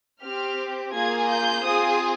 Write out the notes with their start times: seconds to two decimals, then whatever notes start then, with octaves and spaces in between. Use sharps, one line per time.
0.22 C4 G4 F6
0.93 A#3 F4 G#4 G#6
1.28 G6
1.64 C4 F4 G#4 D#6